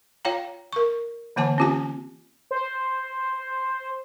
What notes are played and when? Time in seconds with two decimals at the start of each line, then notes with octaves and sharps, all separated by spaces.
0.25 F4 C#5 F5 G5 A#5
0.73 A#4 C#6
1.36 D3 E3 A#3 G#5 A5 D6
1.58 C4 C#4 F4 G4 G#5
2.51 C5